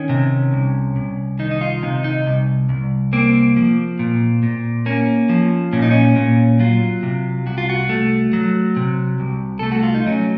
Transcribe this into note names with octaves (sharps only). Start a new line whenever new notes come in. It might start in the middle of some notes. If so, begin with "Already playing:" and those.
Already playing: D#3 C#4
C3
C2
C2
D#3 D#4
D#4
F4
C3 D#4
D#4
C2
C2
A#3 C4
F3
A#2
A#2
A#3 C#4
F3
A#2 C#4
D#4
C#4
A#2
F#3 F4
C3
C2 F#4
F4
F#4
A3
F#3
C3
C2
A3 A4
F#4
F4
D#4
F#3 C#4